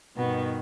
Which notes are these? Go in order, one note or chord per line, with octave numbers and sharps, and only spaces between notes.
G2 B2 D#3 B3